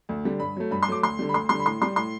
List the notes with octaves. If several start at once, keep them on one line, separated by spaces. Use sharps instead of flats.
D2
D3 G3
G2 B5
F#3 A3
G2 B5
C6
F#3 A3 D6
D2 C6
D3 G3
B5
D2 C6
D3 G3 C6
B5
A2 C6
G3 C6
A2 C6